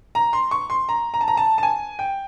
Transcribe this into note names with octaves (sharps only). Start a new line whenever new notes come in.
A#5
C6
C#6
C6
A#5
A#5
A5
A#5
A5
A5
G#5
G5